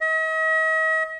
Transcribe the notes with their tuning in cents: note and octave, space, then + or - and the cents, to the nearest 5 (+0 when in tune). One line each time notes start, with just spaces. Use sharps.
D#5 +45